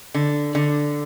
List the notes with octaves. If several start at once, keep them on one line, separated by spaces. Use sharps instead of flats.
D3
D3